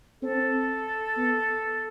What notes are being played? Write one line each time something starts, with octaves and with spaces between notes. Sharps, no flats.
C4 A4
B3